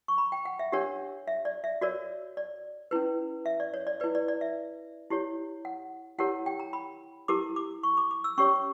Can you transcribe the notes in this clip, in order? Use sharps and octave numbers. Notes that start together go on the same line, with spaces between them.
C#6
B5
G5
F#5
E5
D4 G4 A#4 C#5 F#5
E5
D5
E5
F#4 A#4 C#5 D5
D5
C#4 E4 B4
E5
D5
C#5
D5
E4 B4 D5
D5
D5
E5
E4 G4 C#5
F#5
E4 G4 A#4 C#5 F#5
G5
A#5
B5
E4 G4 A#4 D6
D6
C#6
D6
D6
E6
C#4 G4 C#5 C#6